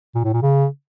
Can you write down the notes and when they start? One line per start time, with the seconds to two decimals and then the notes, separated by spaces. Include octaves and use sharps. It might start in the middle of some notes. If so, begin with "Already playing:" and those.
0.15 A#2
0.24 A2
0.33 A#2
0.42 C#3